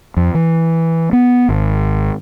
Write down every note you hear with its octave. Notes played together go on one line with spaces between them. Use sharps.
F2
E3
B3
G#1